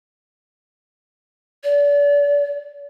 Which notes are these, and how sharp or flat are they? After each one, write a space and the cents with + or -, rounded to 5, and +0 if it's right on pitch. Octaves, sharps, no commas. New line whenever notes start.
D5 -35